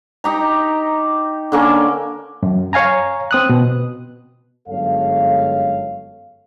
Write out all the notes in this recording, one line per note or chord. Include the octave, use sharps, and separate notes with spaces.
D#4 G4 A#5
D3 A#3 C#4
F#2
C#5 F5 G#5 A#5
C4 D#6 F#6
B2
G1 F#2 G#3 A4 C#5 F5